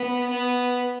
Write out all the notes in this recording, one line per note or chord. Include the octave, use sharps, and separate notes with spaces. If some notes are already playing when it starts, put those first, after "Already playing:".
Already playing: B3
B3